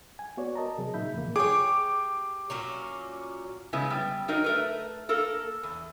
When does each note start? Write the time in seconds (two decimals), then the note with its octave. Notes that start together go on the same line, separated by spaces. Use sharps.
0.19 G#5
0.37 B3 F#4 C#5 D5
0.55 A#4 D#5 A5 A#5
0.78 C3 F#3 G#4
0.94 A#2 C#3 D#4 E5 B5 G6
1.14 F2 A2 C#3 E3 A#3
1.36 G4 G#4 C#5 D6
2.50 A#2 F#3 C#4
3.73 C#3 G#3 B3 E4
3.90 G3 B3
4.28 F#3 D#4 A#4 D#5
4.44 A3 A#4 B4
5.09 A#3 A4 A#4
5.63 E2